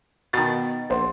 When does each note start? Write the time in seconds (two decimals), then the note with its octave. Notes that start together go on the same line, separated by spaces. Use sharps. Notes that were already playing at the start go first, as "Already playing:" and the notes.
0.33 B2 D#3 A6
0.90 A#1 C5 F#5 C6